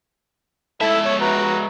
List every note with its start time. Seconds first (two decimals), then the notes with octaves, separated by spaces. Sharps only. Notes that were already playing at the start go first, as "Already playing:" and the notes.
0.81 G#3 E4 A4 E5
1.05 C#5
1.21 F#4 B4 A#5